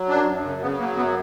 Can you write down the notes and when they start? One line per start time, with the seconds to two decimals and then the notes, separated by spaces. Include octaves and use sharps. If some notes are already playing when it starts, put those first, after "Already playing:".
Already playing: F#3
0.09 F#2 D4
0.26 F#2
0.44 C#3
0.61 C#3 B3
0.79 F#3 A#3
0.96 F#2 B3